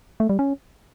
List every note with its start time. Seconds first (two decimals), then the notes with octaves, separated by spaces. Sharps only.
0.20 A3
0.29 G3
0.39 C#4